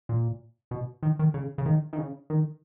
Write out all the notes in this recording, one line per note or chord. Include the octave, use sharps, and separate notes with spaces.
A#2
B2
D#3
D#3
C#3
C#3
D#3
D#3
C#3
D#3